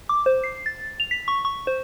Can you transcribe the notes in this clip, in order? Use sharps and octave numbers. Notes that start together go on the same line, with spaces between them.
D6
C5
C7
A6
F7
B6
C#6
C#6
C5